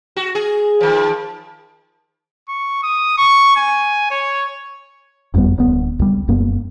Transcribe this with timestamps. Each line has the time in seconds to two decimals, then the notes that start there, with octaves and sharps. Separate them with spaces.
0.16 F#4
0.35 G#4
0.81 D#3 F3
2.49 C#6
2.83 D#6
3.18 C#6
3.57 G#5
4.11 C#5
5.34 F#1 F2 G3 B3
5.58 D1 D2 B3
5.99 C#2 G3
6.28 F1 F#2 A#3 B3